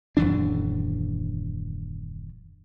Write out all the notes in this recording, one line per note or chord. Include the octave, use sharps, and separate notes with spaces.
D#1 F#2 E3 D4